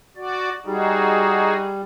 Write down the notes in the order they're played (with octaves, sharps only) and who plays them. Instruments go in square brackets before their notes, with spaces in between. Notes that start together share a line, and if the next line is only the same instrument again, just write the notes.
[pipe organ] F#4 D5
[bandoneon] G3 [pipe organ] D#4 F#4 G#4